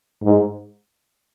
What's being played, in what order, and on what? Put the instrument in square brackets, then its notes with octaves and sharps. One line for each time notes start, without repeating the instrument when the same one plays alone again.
[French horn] G#2